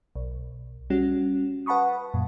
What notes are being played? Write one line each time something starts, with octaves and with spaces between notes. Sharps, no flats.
B1
G3 C#4 F#4
B4 F#5 A5 B5 C#6 D#6
F#2 A#2